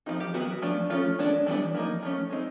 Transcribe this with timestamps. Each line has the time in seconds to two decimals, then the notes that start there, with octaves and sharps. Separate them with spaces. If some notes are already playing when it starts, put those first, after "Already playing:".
0.06 F3 A3 C4 D#4 F#4
0.20 G4
0.34 D#3 F#3 B3 F#4
0.62 F3 A3 D4
0.90 F3 A3 C#4 F4
1.19 D#3 G#3 B3 D4
1.46 E3 G3 B3 D4 E4
1.75 F3 A#3 D#4
2.03 F3 A3 C#4
2.30 G#3 C4 D#4